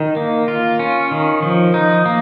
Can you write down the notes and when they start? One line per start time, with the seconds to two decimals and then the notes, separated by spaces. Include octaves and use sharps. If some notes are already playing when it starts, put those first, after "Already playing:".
Already playing: D#3
0.16 A#3
0.48 F4
0.79 C#4
1.11 D#3
1.43 F3
1.74 D#4
2.06 A#3